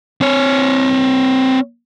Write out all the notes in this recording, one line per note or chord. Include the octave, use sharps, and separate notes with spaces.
C4 C#5